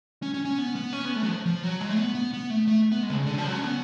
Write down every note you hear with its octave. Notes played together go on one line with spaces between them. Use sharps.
C#4
C#4
C#4
B3
B3
C#4
B3
A3
F#3
F3
F3
F#3
G#3
A3
B3
B3
B3
A3
A3
B3
G#3
D3
C#3
D3
F3
F#3
C#4
B3